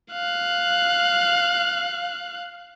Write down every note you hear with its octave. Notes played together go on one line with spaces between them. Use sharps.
F5 F#6